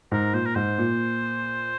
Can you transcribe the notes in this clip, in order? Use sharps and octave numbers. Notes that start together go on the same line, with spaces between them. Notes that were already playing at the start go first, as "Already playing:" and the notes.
G#2 A#4
A#2 C5
A#4
G#2 C5
A#2